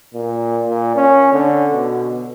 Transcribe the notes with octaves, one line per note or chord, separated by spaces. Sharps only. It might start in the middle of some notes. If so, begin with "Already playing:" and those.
A#2
A#2
C#4
D3
B2